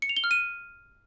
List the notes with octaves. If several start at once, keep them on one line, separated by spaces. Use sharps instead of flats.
C#7
F7
G7
F6
D#7